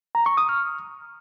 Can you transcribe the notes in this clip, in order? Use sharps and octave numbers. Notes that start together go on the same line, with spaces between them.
A#5
C#6
D#6
F6